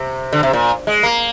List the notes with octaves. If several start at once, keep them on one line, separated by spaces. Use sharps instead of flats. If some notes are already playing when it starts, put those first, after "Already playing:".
Already playing: C3
D3
C3
A#2
G#3
A#3